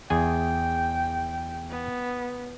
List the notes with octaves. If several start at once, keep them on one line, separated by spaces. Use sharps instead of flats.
E2 G#4 G5 G#5
B3